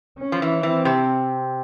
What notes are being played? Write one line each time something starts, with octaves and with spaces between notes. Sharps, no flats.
C#4
F3
E3
E3 C4
C3